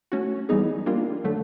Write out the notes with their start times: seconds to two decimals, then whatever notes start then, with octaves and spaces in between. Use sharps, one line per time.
0.12 A3 C#4 F#4
0.49 E3 G3 B3 D#4 G#4
0.86 G3 A#3 D4 F4
1.24 D3 F#3 A3